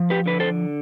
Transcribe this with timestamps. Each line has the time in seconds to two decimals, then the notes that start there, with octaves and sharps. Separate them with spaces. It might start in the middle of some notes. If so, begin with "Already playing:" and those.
Already playing: F3
0.10 G4 B4
0.26 D3 B4
0.40 A4 C5